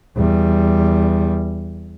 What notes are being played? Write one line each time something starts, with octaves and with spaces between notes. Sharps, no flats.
E2 G3